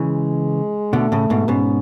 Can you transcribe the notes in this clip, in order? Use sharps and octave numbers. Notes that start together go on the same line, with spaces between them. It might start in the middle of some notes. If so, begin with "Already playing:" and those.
Already playing: C#3 E3 G#3
B2 D3 A3
A2 C#3
G#2 B2
G#2 B2 C#4